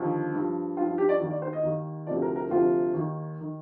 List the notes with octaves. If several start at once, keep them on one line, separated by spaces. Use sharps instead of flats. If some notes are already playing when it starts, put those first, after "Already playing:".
Already playing: D#2 D3 F3
G2
F3
G2 F3 F4
F4
G4
D5
D#2 D#3
D5
C5
D#5
D#2 D#3
D2 C3 F3 D5
A#4
A#4
D2 C3 F3 F4
D#2 D#3
D#3